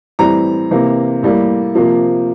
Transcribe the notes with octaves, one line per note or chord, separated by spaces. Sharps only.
A2 E3 G3 C4 A#5
C3 E3 A#3
A2 G3 A#3
C3 F3 A#3